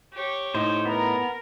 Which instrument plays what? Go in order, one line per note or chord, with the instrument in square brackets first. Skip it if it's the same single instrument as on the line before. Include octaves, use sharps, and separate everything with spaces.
[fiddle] G4 C#5
[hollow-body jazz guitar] A2 D#4 [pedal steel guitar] C5
[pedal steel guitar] B3 [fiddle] A#4 A#5